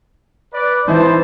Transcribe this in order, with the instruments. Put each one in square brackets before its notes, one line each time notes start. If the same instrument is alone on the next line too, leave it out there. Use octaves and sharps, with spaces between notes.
[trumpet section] B4 D5
[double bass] E3 [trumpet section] C4 C5 A5 [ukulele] D#4 E4